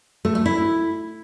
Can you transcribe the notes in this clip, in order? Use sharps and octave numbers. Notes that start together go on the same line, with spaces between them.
A3
A3
E4